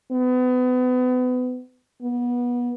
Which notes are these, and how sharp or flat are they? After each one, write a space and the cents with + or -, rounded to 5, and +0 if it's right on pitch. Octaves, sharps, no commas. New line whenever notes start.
B3 +30
B3 -25